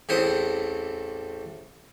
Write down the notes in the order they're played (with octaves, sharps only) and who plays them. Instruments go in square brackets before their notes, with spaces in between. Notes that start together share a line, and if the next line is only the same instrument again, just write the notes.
[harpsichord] A1 E2 A2 C4 C5 D#6